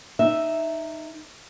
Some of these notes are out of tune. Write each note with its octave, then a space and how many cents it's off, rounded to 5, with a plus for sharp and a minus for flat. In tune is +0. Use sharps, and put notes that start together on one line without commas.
D#4 -10 E5 +0